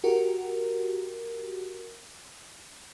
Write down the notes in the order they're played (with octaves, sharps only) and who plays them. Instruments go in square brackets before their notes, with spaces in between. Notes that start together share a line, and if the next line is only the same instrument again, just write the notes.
[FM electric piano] F#4 G4 A#4